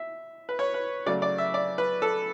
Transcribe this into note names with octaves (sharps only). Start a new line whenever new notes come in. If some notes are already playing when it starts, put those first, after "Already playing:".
Already playing: E5
B4
C#5
B4
C#3 F#3 A3 D5
D5
E5
D5
B4
A4